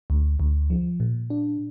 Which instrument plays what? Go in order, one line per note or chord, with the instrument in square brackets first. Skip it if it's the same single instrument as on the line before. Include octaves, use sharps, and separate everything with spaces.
[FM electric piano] D2
D2
F3
A#2
D4